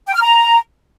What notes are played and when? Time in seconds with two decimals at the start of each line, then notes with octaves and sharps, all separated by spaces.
0.07 G5
0.14 F6
0.22 A#5